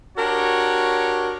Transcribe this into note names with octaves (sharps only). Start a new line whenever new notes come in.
D4 F#4 G4 A#4 C#5